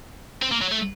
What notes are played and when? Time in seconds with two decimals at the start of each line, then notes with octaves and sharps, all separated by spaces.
0.42 C4
0.52 A#3
0.62 F#3
0.72 A3